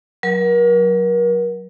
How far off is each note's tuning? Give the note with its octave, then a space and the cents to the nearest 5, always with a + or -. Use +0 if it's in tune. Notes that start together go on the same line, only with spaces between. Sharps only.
F#3 +0 A#4 +35